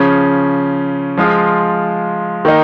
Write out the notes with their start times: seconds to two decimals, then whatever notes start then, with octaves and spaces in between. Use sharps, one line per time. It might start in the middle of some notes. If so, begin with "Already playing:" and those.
Already playing: C#3 F3 C#4
1.17 F3 G#3 F4
2.45 D#3 A#3 D#4